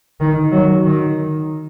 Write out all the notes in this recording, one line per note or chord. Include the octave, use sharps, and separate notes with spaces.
D#3
F#3
D#3